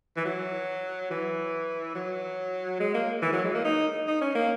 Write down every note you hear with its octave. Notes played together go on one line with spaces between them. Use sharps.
E3
F#3
E3
F#3
G#3
A#3
E3
F#3
G#3
A#3
D#4
D#4
C#4
A#3